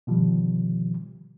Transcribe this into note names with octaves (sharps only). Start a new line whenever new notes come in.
B2 D3 D#3 F3 G3